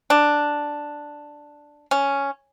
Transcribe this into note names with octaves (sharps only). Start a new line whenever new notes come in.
D4
C#4